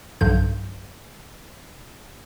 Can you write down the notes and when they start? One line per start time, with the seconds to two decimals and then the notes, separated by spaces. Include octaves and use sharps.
0.21 B1 G2 D3 G6